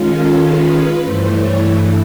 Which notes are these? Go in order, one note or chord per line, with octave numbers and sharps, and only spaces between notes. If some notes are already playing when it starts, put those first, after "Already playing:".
Already playing: D#3 G#3 C#4 F4
A4
B4
G2 E3 A3 C5
C#5